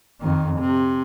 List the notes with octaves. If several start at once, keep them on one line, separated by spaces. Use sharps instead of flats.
F2 D#3
C3